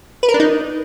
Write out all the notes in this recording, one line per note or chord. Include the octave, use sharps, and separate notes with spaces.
B4
A#4
D4
D#4